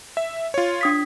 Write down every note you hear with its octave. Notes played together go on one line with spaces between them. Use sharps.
E5
F4 C#5
D4 D#6 B6